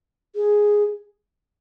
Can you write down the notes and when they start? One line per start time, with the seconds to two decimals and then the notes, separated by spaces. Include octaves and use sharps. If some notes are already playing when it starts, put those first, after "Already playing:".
0.35 G#4